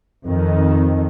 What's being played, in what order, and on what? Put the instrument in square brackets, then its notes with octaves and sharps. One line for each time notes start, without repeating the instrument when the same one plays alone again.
[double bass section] F2 D#3